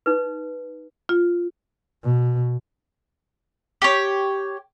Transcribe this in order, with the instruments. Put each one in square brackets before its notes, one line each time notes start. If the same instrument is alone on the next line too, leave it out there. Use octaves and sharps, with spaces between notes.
[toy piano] D#4 B4
[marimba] F4
[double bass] B2
[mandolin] G4 C#5